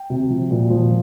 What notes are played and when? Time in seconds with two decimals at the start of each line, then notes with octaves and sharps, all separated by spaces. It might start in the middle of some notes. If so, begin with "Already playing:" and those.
Already playing: G5
0.10 C3
0.30 F3
0.51 A#2
0.70 F3